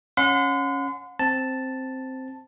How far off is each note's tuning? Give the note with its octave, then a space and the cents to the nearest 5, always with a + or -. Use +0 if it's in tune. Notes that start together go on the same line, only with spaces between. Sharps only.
C#4 -5 F#5 -35 C6 -40
C4 +0 A5 +0